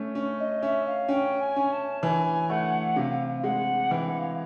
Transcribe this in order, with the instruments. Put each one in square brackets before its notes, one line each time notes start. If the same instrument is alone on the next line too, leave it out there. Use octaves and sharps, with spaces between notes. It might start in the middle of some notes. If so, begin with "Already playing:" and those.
Already playing: [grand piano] A3 C#4
C#4
[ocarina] D#5
[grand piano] C#4 [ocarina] E5
[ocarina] F5
[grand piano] C#4 [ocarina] G5
[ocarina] G#5
[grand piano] C#4
[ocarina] A5
[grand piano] E3 [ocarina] G#5
[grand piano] A3 [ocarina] F#5
[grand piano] C3 [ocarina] F5
[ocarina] F5
[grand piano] G#3 [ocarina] F#5
[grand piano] E3 [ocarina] G5
[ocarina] F#5
F5